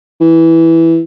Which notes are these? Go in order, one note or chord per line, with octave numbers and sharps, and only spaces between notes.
E3